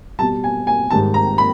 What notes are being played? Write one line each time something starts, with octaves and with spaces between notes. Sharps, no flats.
B2 G3 A5
G#5
G#5
G#2 D#3 G3 A5
A#5
B5